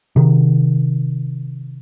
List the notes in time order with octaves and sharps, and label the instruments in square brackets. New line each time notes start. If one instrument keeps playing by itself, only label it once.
[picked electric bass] C3 D#3